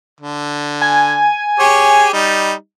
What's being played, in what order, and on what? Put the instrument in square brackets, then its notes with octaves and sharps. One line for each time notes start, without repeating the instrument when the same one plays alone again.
[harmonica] D3
[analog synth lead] G#5
[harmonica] G4 G#4 C#5
G3 D#4